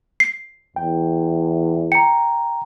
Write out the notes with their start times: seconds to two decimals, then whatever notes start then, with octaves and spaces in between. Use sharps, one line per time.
0.20 C7
0.76 E2 G5
1.92 G5 A#5 C#7